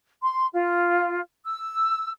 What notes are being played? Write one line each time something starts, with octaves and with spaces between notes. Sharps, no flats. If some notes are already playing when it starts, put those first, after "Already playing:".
C6
F4
E6